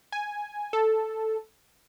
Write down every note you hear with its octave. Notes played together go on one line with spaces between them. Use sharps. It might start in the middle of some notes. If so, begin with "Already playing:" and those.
G#5
A4